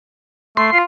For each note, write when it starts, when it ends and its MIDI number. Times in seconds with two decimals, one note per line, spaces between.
0.57 0.70 57
0.57 0.78 84
0.73 0.83 65